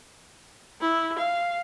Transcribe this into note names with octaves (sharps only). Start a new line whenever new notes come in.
E4
F5